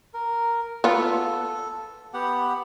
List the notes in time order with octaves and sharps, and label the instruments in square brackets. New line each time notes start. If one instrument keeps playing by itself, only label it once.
[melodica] A#4
[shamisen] B3 F4 [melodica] A4
[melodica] B3 G4 F#5